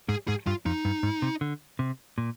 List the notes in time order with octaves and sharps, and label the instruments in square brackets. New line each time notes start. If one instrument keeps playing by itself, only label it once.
[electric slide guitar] G#2 [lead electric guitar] G#4
[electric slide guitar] G#2 [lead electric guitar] G#4
[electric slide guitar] G2 [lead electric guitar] F4
[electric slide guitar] F2 [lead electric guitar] D#4
[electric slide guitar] G2
G#2
C3
D3
C3
A#2